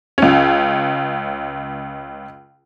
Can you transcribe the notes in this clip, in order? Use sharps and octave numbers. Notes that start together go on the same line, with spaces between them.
C#2 C#4